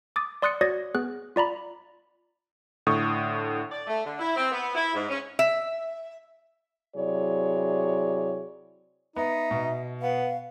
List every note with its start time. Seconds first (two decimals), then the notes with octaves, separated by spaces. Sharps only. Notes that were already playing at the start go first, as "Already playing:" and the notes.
0.16 D6 D#6 A6
0.42 D5 C6 D#6 F#6 A6 C#7
0.61 F#4 C#5 D5 D#6 G#6 A#6
0.95 B3 G#4 F#6
1.36 F4 D5 A#5 B5
2.87 A2 D3 C#6 D#6
3.71 D5
3.86 A3
4.04 D3
4.19 E4
4.36 C4
4.52 B3
4.74 E4
4.94 G#2
5.09 C#4
5.39 E5
6.97 C3 F#3 E4 G#4 C#5 D5
9.16 B3 D#4 E5
9.51 B2
10.01 B3 F5